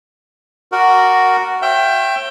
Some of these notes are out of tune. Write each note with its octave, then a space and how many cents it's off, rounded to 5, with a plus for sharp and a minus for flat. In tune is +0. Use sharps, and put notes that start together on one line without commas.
F#4 +5 A#4 -5 D5 +0
C#5 -40 E5 +25 G5 +0